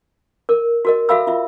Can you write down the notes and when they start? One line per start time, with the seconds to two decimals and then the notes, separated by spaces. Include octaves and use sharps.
0.49 A#4
0.85 F#4 A#4 D#5
1.09 F#4 A4 E5 F5 B5 E6
1.27 F4 E5